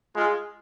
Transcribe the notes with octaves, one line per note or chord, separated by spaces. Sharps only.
G#3 F4